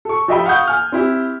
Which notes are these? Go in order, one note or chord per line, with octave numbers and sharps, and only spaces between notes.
A4 C#6
F3 G4 D#5 E5 G5 B5
F5 F#5 C#6 D#6 G6
G#5 F6
C4 E4 G4